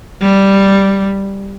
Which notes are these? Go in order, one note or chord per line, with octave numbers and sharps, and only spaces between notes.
G3